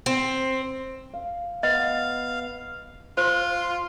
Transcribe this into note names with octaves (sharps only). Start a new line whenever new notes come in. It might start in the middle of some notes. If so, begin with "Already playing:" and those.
C4
F5
B3 D#5 F5
F4 C5 C6